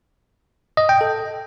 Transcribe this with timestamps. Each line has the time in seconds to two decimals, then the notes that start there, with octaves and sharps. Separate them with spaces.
0.77 D#5
0.89 G5
1.01 A4